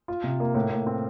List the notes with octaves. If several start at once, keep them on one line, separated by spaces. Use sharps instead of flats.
F4
C3
A#3
A2
A2
C4